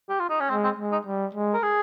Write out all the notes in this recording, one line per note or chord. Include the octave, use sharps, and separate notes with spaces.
G4
F4
D#4
C#4
G#3 C4
C4
G#3
D#4
G3
G#3
A#4
G#4